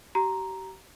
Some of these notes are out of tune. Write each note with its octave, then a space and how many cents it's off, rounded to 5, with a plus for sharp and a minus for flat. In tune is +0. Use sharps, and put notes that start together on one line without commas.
G4 -35 A#5 +0